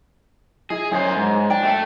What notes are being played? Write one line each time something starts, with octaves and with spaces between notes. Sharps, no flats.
E4 G#4 D#5
F#2 C5 C#5 D#5 G#5
G#2
D4 G5
A3 A4